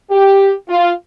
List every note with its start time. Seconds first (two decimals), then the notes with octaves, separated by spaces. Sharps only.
0.11 G4
0.69 F4